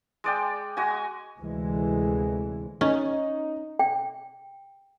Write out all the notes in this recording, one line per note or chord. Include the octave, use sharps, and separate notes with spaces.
G#3 D5 G5
G#3 F#4 D#5 G#5
D2 C3 E3 G#3
C#4 D#4
G5